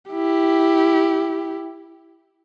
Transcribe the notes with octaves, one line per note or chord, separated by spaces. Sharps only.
E4 G4